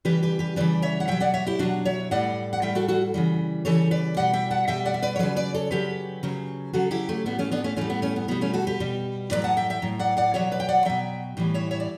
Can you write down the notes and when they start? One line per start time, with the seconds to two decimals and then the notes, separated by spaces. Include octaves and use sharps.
0.05 C#3 E3 G3 G4 B4
0.23 G4 B4
0.39 G4 B4
0.56 C#3 E3 G3 B4 D5
0.82 C#5 E5
1.00 F#5
1.08 B2 F#3 E5 G5
1.20 D5 F#5
1.34 C#5 E5
1.47 E4 G4
1.59 B2 F#3 D4 F#4
1.85 C#5 E5
2.11 A2 G3 D5 F#5
2.53 F#5
2.62 A2 G3 E5 G5
2.75 F#4 A4
2.88 F#4 A4
3.14 C#3 E3 G3
3.65 C#3 E3 G3 A4 C#5
3.91 B4 D5
4.17 B2 G3 D5 F#5
4.33 E5 G5
4.51 F#5 A5
4.68 B2 G3 E5 G5
4.85 D5 F#5
4.94 E5
5.02 B4 D5
5.16 C#5
5.19 C#3 F#3 B4 D5
5.36 B4 D5
5.54 A4 C#5
5.71 C#3 F#3 G4 B4
6.23 C#3 F#3
6.73 C#3 F#3 F#4 A4
6.91 E4 G4
7.09 A3
7.26 A2 G3 B3
7.39 A3 C#4
7.51 B3 D4
7.64 A3 C#4
7.76 A2 G3 A3 C#4
7.90 B3
8.02 A3 C#4
8.16 B3
8.28 B2 G3 B3
8.41 A3 C#4
8.54 F#4 A4
8.67 G4 B4
8.80 B2 G3
9.31 A2 F#3 B4 D5
9.44 F#5 A5
9.57 E5 G5
9.70 E5 G5
9.82 A2 F#3
9.99 D5 F#5
10.17 D5 F#5
10.34 B2 F#3 C#5 E5
10.52 B4 D5
10.60 G5
10.68 D5 F#5
10.85 B2 F#3 E5 G5
11.37 A2 E3 G3
11.54 C#5 E5
11.71 C#5 E5
11.80 D5